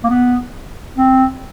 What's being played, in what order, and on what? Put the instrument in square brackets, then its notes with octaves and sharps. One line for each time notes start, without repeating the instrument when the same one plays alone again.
[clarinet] A#3
B3
C4